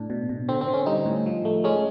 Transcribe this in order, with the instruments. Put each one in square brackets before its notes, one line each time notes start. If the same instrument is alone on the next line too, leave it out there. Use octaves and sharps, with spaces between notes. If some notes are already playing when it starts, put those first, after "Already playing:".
Already playing: [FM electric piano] A2 D4
B2
B2
D3 C4
C4
D3
C#4
G3 D#4
A2
F3
A3
G#3 C#4